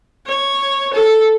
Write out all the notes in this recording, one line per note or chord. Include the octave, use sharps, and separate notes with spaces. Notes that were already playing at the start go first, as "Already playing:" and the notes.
C#5
A4